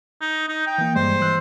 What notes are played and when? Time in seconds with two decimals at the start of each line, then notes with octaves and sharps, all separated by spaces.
0.21 D#4
0.48 D#4
0.66 G5
0.78 E3 A#3
0.95 G2 G3 G#3 C5
1.21 E3 E6 F#6